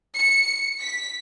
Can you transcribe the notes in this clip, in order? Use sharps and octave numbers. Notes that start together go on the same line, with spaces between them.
C#7
B6